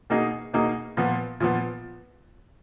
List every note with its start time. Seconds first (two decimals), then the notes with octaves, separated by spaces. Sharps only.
0.10 B2 A#3 D#4 G#4
0.54 B2 A#3 D#4 G#4
0.97 A#2 F3 B3
1.40 A#2 F3 B3